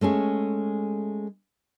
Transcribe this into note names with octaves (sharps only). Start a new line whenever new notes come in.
G#3 A3 C#4 G#4